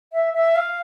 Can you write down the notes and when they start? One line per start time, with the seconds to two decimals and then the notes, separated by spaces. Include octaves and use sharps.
0.13 E5
0.34 E5
0.56 F5